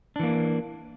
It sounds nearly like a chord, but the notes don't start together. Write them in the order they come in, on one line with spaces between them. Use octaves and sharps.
D4 E3 A#3